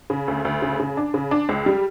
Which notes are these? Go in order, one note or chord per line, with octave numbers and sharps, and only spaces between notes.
C#3
D2
D2
C#3
C#3
D4
C#3
D4
C#2
G3